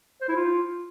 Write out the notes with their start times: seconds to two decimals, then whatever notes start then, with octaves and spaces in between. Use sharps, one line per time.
0.21 C5
0.29 E4
0.36 F4